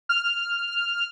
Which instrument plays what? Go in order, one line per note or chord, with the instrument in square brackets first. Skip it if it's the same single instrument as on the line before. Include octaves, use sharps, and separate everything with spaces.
[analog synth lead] F6